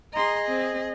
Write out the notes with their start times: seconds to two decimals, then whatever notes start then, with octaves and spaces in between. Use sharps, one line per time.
0.13 G#4 D#5 A#5 C6
0.48 C4